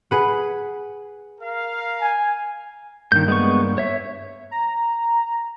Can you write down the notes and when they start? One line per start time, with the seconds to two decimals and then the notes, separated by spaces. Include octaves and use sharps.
0.11 G#4 B4 F#5
1.40 A#4 F5
2.01 G#5
3.12 G2 D#3 A#3 G6
3.28 G#3 B3 C#6
3.78 C#5 E5
4.51 A#5